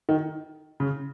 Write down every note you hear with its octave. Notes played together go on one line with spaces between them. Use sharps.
D#3
C#3